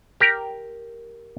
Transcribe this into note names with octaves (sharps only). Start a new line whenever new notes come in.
G4 A#4